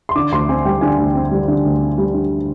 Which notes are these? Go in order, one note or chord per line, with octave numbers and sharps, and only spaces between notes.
C6
D3 D6
D2 C6
C4 G#5
G3 G5
D3 G#5
D2
C4
G3
D3
D2
C4
G3
D3